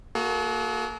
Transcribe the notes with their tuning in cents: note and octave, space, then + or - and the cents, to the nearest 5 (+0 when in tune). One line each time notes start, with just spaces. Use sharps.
A#3 -10 F#4 +0 A4 -45